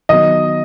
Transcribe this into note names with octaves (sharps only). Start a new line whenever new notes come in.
D#3 F#3 B3 D#5